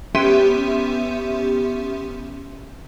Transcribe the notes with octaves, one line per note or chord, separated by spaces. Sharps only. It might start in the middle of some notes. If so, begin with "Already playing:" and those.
B3 C#4 G4 E5 C6 D#7